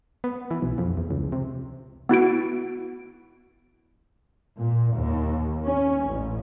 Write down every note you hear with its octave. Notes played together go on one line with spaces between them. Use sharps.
B3
E3
B1
F2
E2
C#2
C3
B3 E4 F#4 D7
A#2
D#2
C#4
A1